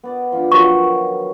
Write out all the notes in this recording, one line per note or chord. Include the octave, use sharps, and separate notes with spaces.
B3 D5
F3 D4
D#3 F3 F#3 F#4 C#6